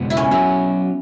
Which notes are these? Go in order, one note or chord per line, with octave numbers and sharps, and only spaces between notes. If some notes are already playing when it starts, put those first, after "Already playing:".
Already playing: C#2 B2 G#3 B3
E4
C#4
F#3 B3 E4 F#4 C#5